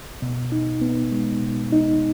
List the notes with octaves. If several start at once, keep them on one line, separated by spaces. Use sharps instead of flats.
B2
D#4
B3
G#3
B2
D#4